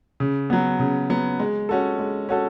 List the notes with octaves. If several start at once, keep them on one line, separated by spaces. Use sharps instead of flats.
C#3
F#3 B3
C#3
F#3 B3
G#3
C#4 F#4 A4
G#3
C#4 F#4 A4